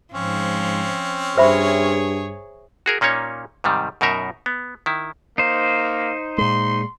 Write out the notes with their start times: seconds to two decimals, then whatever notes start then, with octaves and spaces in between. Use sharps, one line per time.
0.14 G#2 F3 C4 C#4
1.38 G2 G#4 C5 C#5 E5 B5
2.86 F#4 G#4 A#4
3.01 A#2 A#3 C#4 D#4 C#5
3.64 G#2 C3 D#3 G3
4.01 F#2 B2 D#4 A#4 E5
4.46 B3
4.86 D#3 E4
5.38 A#3 D#4 C5
6.38 A#2 G#3 C6